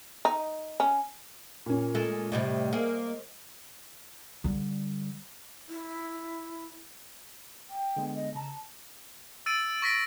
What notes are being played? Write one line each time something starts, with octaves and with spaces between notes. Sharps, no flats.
D#4
C#4
A#2 C#4
G#3 A4
A2 C3 G3 C5 D#5
A#3 G#4
D3 G3
E4
G5
D3 G#3 B3
D#5
C#3 A5 A#5
E6 A6 D7 D#7
C#6 A#6 B6 D7